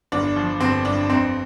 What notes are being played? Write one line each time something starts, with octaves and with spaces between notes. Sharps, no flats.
G1 D4
F3
G1 C4
G2 D4
F2 C4